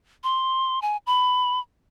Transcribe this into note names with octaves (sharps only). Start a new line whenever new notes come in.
C6
G#5
B5